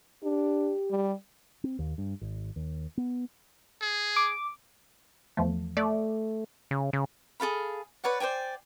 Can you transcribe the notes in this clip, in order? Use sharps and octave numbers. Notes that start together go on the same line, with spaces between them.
D4 G4
G3
C4
D#2
G2
G#1
D#2
B3
G#4
D6
E2 F3 A3
A3 D5
C#3
C#3
G#4 A4 F5 B5
B4 C#5 D5 F#5
C5 D5 G5 G#5